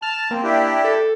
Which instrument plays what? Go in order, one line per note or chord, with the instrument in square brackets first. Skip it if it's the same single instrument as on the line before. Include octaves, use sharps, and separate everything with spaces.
[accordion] A5 [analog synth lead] F6
[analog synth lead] A#3 [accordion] C4
[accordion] D4 E4 G4
[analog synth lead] A4